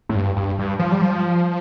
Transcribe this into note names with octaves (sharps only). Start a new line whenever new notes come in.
A2
G2
G2
G2
F3
G3
F3